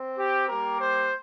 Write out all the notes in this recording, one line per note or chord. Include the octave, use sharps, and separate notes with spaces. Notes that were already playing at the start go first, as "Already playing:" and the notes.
Already playing: C4
G4
G3 A#3 G4 A#4
C5